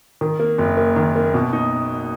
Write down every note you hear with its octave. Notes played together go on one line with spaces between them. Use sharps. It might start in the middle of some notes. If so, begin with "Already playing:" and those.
D#3
A#3
F#1
A#3
D#3
A#3
B2
D#4